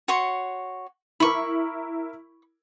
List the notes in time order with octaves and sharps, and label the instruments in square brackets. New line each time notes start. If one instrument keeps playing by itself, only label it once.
[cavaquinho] F#4 C#5 C6
[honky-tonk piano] E4 A#4 [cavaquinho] B5 C#6